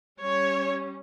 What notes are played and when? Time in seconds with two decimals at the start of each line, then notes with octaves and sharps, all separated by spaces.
0.20 G3 C#4 C#5